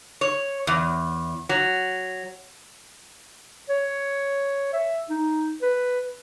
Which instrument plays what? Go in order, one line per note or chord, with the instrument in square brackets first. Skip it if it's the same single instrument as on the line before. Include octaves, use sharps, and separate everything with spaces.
[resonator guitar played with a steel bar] C#5
E2
F#3
[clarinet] C#5
E5
D#4
B4